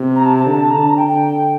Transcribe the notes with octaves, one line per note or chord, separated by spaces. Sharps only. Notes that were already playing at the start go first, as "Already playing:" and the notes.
Already playing: C3
A#5
A5
A5
D3
A#5
D3 A5
A#5
G5
G5